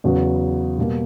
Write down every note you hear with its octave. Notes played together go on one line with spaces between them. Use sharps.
E2 C#3 F#3 B3 F#4
B2 G3 A#3